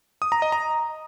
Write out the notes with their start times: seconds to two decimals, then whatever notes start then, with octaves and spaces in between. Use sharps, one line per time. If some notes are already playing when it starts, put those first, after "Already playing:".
0.22 D#6
0.32 A#5
0.42 D#5
0.52 A#5